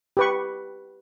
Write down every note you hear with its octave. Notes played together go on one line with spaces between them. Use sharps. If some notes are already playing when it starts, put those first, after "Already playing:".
G4 B4 C#6